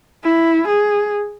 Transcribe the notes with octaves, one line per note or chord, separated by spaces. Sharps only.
E4
G#4